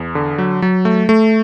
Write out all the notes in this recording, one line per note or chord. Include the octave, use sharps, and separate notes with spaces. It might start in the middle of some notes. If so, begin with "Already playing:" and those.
Already playing: E2
D3
F#3
F#3
A3
A3